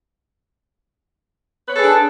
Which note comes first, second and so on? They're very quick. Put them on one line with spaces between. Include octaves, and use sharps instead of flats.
B4 C#5 A4 G#4 D4